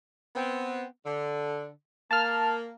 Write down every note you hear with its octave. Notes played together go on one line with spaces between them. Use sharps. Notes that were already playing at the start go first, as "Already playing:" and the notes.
B3 C4
D3
A#3 A5 F6